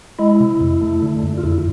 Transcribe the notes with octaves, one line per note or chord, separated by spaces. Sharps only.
G#3 E4
C3
F2
A3
D3
F#2
F4
F2 E4